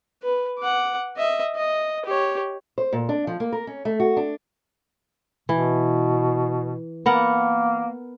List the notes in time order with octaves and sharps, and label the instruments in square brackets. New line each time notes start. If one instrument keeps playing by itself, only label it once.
[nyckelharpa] B4
F#5 D6
D#5 E5
D#5
G4 C#5
[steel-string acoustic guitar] C5
A#2
D4
F3
A#3
A#4
C#4
A3
F#4
D4
[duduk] B2 [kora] E3
[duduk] A#3 [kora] B3 A#4 F#5